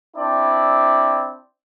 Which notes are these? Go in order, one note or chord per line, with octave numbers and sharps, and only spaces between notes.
C4 D4 E4 D5